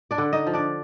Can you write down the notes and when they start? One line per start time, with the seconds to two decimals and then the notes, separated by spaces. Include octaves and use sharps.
0.11 D4 D5
0.18 D3
0.33 D#4 D#5
0.47 F3
0.53 D4 D5